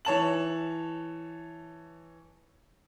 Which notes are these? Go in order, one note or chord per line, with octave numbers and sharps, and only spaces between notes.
E3 C#5 A5 F#7